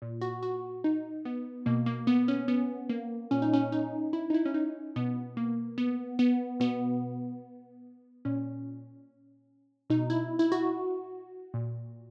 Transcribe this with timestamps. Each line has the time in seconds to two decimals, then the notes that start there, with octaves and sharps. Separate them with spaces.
0.02 A#2
0.21 F#4
0.43 F#4
0.84 D#4
1.25 B3
1.66 B2 A#3
1.86 A#3
2.07 B3
2.28 C#4
2.48 B3
2.90 A#3
3.31 A#2 C#4
3.42 D#4
3.53 C#4
3.72 D#4
4.13 E4
4.30 D#4
4.34 E4
4.45 C#4
4.54 D#4
4.96 B2 B3
5.37 A#3
5.78 B3
6.19 B3
6.60 B2 B3
8.25 A#2 C#4
9.90 B2 D#4
10.10 E4
10.39 E4
10.52 F#4
11.54 A#2